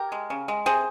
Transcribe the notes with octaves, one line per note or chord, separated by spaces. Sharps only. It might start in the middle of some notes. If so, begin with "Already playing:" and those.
Already playing: G4 A#4
G#3
C#3
G#3
C3 G#4 C5